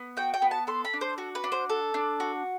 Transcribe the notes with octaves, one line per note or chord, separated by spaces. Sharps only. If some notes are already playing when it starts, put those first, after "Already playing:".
Already playing: B3
F#4 G5
G5
B3
A5
A4 C6
B5
D4
C5
F#4
B4
D4
C5
A4
D4
F#4